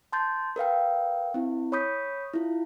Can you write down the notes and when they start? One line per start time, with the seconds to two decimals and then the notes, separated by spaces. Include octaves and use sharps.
0.12 A5 C6 G6 A6
0.56 A#4 B4 F5 G5
1.34 C4 E4
1.72 C#5 B5 C#6 D#6 G6 B6
2.33 E4 F4